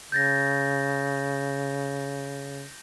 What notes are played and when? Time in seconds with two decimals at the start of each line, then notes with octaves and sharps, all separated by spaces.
0.12 C#3 G6 A6 A#6